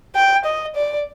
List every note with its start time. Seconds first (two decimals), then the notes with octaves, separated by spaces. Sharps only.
0.16 G5
0.45 D#5
0.76 D5